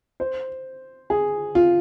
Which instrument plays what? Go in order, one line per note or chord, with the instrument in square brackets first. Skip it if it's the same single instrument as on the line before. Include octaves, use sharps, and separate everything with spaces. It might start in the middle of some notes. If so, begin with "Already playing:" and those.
[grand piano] C5
G#4
F4